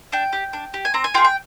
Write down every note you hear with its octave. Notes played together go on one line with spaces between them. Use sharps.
D4 G5
G4
D4
G4
G#5
C4 A#5
G#5
F4 G#4 G5
G5